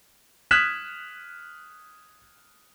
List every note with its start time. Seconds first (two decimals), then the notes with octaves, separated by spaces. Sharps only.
0.51 D#6 F6 F#6 G#6 B6 E7